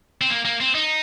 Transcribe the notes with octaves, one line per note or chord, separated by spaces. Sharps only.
C4
A#3
A#3
C4
D#4